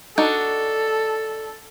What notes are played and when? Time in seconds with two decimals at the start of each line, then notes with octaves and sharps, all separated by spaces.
0.18 D4 D#4 F#4 A4